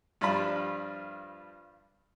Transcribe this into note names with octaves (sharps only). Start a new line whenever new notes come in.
G2 F3 G3 D4 F4 B5